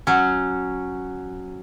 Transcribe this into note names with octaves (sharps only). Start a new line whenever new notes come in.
F#3 C#4